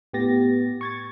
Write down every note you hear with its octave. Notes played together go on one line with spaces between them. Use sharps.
A2 B3 G4 A6 A#6
C#6 G#6 A6